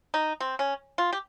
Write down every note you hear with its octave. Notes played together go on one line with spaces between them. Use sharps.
D#4
C4
C#4
F4
G4